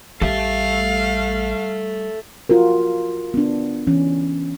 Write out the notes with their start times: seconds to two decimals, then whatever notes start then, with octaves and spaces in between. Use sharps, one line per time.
0.21 A1 G3 A4 E5 F5
2.49 F4 F#4 A#4
3.34 B3 D4
3.87 E3 C#4